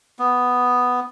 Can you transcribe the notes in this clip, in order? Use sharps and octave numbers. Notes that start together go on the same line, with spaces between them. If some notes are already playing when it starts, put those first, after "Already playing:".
B3